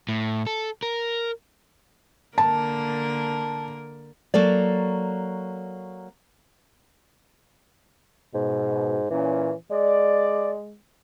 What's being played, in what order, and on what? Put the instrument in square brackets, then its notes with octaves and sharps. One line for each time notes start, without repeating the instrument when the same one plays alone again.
[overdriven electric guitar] A2
A4
A#4
[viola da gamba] D3 A#3 A#4 [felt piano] A5
[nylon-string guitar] F#3 A#3 A4 D5
[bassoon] G#2 [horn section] B2
[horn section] A#2 C#4 [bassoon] E3
[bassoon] G#3 [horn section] D5